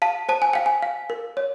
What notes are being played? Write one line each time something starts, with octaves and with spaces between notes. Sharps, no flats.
F5 A5
C5 A5
G#5
F5 G5
G#5
F5
A#4
C#5